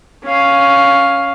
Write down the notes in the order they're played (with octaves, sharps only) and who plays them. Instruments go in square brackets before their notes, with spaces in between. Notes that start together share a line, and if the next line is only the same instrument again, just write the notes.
[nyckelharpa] C#4 F5